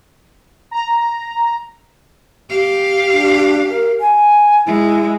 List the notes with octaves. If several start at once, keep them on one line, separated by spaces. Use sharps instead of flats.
A#5
G4 F5
D4
A#4
G#5
G#3 E4